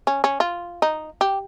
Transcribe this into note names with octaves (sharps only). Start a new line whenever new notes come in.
C#4
C#4
F4
D#4
G4